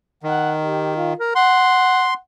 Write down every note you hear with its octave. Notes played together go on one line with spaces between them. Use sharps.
D#3 F#5
G4
F4
A#4
F#5 C6